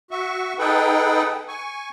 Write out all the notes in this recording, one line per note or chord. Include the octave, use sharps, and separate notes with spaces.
F#4 E5 C#6
D#4 G#4 A4 B4 F#5 G5
G#5 C#6